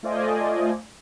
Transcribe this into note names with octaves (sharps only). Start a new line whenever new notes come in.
A3 F4 C5 D5 D#5 G#5